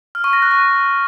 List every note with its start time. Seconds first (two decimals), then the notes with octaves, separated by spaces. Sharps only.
0.15 F6
0.24 C#6
0.33 A#6
0.42 F#6
0.51 C#6